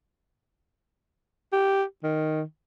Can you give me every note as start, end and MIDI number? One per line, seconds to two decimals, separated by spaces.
1.53 1.83 67
2.03 2.42 51